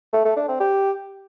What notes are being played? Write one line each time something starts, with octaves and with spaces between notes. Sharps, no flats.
A3
A3
D4
C4
G4